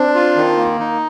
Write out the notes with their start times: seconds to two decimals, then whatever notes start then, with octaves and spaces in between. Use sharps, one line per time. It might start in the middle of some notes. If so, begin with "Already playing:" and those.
Already playing: C4 D4 C5
0.15 F4
0.36 D#3
0.57 A#3
0.79 D#4